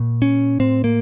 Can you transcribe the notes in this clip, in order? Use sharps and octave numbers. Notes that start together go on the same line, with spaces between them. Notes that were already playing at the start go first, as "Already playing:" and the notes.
Already playing: A#2
C#4
A2 C4
A#3